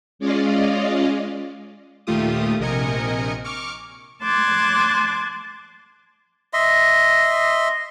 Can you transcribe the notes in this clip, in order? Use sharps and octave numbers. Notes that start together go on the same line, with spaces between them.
G#3 C#4 F4 D5 D#5 F5
D#2 A#2 A3 F4 G4 D#6
A#1 C3 A#4 D#5 G#5 C#7
C#6 D6 F6 C#7
A5 C6 D6 F#6 G#6
D#5 E5 C6